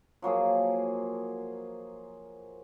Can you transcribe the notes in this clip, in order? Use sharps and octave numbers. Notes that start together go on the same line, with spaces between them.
F3 F#3 A#3 G#4